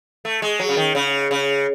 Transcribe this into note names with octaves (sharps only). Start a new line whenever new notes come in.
A3
G#3
F#3
C#3
D#3
C#3
C#3